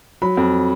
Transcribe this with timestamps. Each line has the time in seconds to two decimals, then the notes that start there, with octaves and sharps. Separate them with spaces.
0.22 F#3 B5
0.37 F2